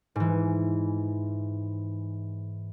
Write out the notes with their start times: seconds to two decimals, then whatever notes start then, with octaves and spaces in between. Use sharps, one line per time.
0.16 G#2 E3